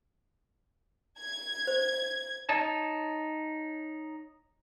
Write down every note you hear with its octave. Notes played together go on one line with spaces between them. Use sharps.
G#6
C5
D#4 C#5 A5